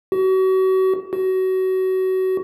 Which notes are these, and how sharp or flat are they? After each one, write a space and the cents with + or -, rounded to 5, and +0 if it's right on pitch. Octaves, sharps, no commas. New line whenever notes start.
F#4 +35
F#4 +25